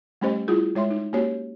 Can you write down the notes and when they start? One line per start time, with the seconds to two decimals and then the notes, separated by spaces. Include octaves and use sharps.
0.21 G3 A3 C#4 G4 C5 D#5
0.48 G3 E4 F4 G#4
0.75 G#3 C#5 E5 C6
0.90 D#4
1.13 A#3 C#4 F#4 G4 C#5